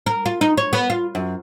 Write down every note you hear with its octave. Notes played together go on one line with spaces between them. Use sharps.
A#4
F4
D#4
C#5
B3
F4
F#2